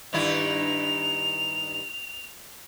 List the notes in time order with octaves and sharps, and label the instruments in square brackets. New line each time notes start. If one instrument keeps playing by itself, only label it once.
[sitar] G2 D#3 E4 [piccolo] F7